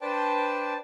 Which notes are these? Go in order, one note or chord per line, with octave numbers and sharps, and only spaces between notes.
D4 B4 C5 D5 G5 A5